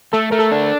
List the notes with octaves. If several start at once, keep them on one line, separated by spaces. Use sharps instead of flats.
A3 A4
A3 A#4
A4
D4